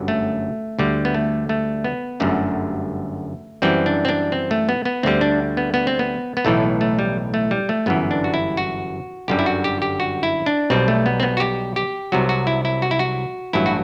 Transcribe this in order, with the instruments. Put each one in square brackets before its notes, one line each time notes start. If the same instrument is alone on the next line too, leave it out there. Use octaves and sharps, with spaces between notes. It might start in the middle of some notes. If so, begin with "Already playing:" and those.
Already playing: [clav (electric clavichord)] G1 F#2 D3 F#3
A3
D2 D3 G3
B3
A3
A3
B3
G1 F#2 D3 A3
F#2 E3 G3 C4
D4
C4
D4
C4
A3
B3
B3
D2 D3 G3 C4
D4
B3
B3
C4
B3
B3
B1 A2 E3 A3
A3
G3
A3
G3
A3
G1 F#2 E3 B3
D4
F#4
E4
F#4
G1 F#2 D3 G3 G4
E4
F#4
G4
G4
F#4
E4
D4
B1 B2 G3 C4
A3
B3
C4
B3
F#4
G4
G4
C2 C3 F#3 F#4
F#4
E4
E4
F#4
E4
F#4
A1 G2 F#3 E4
F#4